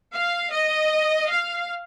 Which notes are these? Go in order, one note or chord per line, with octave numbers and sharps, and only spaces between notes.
F5
D#5
F5